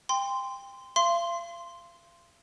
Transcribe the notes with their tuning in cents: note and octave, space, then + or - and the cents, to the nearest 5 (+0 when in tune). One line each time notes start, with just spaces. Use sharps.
G5 +25 C6 -15
F5 -40 C6 +0